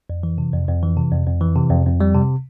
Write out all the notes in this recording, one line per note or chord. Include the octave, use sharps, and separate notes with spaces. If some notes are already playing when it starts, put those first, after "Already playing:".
F2
E3
C3
F2
F2
E3
C3
F2
F2
E3
C3
F2
F2
G3
C3